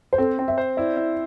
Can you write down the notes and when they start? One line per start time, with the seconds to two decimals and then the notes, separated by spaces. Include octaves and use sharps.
0.13 C5
0.18 C4 A4
0.39 C4
0.48 E5
0.58 C5
0.77 E4 D5
0.97 E4